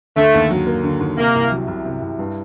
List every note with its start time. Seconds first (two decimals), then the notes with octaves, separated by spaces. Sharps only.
0.16 D3 A3
0.34 D#2
0.50 F#3
0.67 A#3
0.84 D3
1.00 D#2
1.18 C3 A#3
1.35 C2
1.52 F#3
1.68 C2
1.85 C3
2.02 C2
2.19 G2